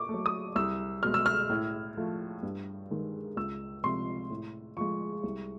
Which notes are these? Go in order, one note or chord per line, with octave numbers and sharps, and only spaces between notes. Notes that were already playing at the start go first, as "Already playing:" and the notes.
Already playing: A#2 C#6 D6
A3
F#3
D#6
C2 E6
B2 G#3 F6
E6
F6
A2
F3 A3
G2
D#3 G#3
C#2 E6
C3 F3 G#3 C6
A2
F3 G#3 C#6
C2